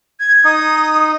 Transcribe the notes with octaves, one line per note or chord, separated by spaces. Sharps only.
G#6
D#4 D#6